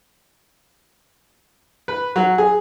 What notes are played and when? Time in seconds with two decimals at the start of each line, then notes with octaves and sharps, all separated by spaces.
1.88 B4
2.16 F#3
2.38 G#4